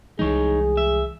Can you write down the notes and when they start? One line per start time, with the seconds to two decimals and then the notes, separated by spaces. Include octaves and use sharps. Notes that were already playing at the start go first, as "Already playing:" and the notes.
0.19 C2 E3 G#3 D#4 G#4 C#5
0.77 E5